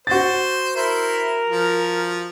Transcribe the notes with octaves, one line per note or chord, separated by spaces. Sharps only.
F#4 C5 A6
E4 A#4 C5
F3